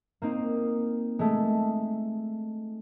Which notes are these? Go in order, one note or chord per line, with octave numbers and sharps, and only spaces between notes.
A#3 C4 D#4
G#3 A3